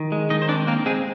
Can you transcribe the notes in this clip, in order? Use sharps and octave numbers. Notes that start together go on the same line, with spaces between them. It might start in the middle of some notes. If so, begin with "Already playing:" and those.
Already playing: D#3
G#3
D#3 D#4 D#5
C5
C4 D4 D5
A#3 C4 A#4
G#3 C4 G#4